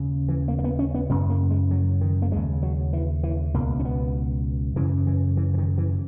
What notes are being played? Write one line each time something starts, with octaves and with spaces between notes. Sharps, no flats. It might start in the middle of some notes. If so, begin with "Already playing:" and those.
Already playing: D#2 C#3
E3
A#3
A#3
B3
C#4
B3
F#2 C#3 B3
A#3
G#3
F#3
D#3
A#3
D#2 C#3 G#3
F#3
E3
E3
C#2 B2 A#3
C#4
B3
F#2 C#3 E3
E3
E3
E3
D#3
E3